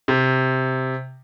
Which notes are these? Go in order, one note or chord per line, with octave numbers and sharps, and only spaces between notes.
C3